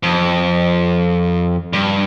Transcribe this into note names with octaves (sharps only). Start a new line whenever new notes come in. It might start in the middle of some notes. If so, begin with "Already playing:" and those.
F2
G2